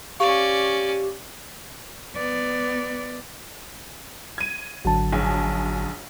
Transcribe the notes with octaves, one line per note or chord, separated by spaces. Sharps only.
C#4 G4 D5 F5 C#6
B3 D5
G#6 D#7
G#1 D3 F#3 F#4 A5
A#1 F#2 G#5